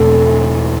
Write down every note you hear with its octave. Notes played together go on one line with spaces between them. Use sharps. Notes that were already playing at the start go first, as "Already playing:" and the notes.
Already playing: E2 B2 D3 A3
E3